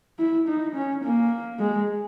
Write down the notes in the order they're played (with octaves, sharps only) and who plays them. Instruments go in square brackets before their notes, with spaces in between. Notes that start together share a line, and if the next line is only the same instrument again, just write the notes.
[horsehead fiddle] E4
D#4
C#4
A#3
G#3